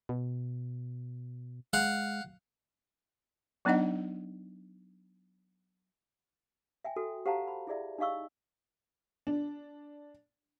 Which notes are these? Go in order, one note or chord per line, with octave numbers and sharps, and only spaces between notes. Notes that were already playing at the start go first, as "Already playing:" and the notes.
B2
G#3 F5 F#5
F#3 B3 D4 D#4 D#5 F#5
E5 G5 G#5
F#4 A4
G4 C5 F5 F#5 A5 A#5
B5
E4 G#4 D5 E5
D#4 G4 D#5 F5 C#6 E6
D4